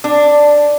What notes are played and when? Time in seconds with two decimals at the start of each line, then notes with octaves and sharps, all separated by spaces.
0.04 D4